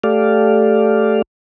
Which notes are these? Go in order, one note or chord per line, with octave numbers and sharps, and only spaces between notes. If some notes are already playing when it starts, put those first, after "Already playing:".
A3 G4 A4 D5 F5